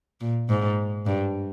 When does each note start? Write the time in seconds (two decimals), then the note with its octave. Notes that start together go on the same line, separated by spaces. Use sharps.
0.21 A#2
0.49 G#2
1.06 G2